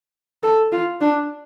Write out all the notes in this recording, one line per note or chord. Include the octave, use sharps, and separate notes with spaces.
A4
F4
D4